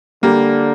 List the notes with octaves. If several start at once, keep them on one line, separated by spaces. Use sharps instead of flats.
D3 G3 A#3